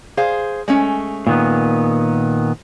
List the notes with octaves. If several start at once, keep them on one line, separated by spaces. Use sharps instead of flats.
G#4 C5 F5
G#3 A3 C#4
A#2 D#3 B3